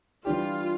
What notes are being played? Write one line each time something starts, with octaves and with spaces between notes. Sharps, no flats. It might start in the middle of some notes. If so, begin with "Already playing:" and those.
E3 G3 D4 F4 G4